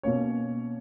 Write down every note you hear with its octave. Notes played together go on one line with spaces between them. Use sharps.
B2 A#3 C#4 C#5